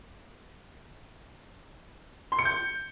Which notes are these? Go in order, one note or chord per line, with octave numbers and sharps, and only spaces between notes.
C6
C#7
G6